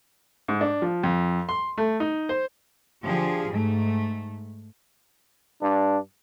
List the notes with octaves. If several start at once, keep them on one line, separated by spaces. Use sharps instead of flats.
G#2
D4
F3
F2
C6
A3
D#4
C5
D3 F3 G4 G#4
G#2 A3
G2 D4